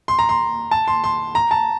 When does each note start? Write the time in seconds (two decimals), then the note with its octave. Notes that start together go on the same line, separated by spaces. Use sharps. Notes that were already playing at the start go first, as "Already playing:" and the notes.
0.08 C6
0.19 A#5
0.29 C6
0.71 A5
0.88 C6
1.04 C6
1.35 A#5
1.51 A5